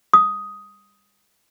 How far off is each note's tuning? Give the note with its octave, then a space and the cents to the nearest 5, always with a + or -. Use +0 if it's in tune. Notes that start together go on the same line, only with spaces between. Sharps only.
D#6 +5